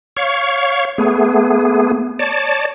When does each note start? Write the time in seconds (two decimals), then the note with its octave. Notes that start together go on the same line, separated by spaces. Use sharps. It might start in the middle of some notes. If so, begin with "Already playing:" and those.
0.17 C#5 F5 C#6
0.98 A3 B3 G#4
2.19 C#5 D5 A5